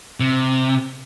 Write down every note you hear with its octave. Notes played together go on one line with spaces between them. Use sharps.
C3